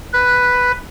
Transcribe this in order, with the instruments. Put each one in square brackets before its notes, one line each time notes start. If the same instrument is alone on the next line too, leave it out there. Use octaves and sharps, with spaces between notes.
[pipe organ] B4